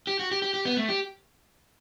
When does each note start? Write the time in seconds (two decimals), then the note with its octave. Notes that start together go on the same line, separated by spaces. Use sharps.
0.07 G4
0.19 F#4
0.31 G4
0.42 G4
0.54 G4
0.65 B3
0.77 A3
0.89 G4